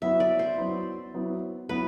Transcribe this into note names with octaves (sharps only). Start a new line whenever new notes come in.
F#3 B3 E4 E5
D5
C5
F#3 B3 E4
F#3 B3 E4
F#3 B3 E4 B4